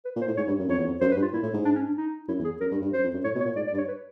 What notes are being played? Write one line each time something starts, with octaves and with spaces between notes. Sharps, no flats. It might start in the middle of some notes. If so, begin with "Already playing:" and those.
B4
A#2
C5
A2
G#2 C#5
G2
F#2
F2 C#5
E2
F2
F#2 C5
B4
G2
F4
A#2 E4
A2
G#2
D4
C#4
D4
D#4
F#2 E4
E2
G#4
F#2 A#4
G2
G2
F#2 C5
F2
F#2
A2 C#5
B2
C#5
A#2
G#2 D5
D5
G2
C#5
B4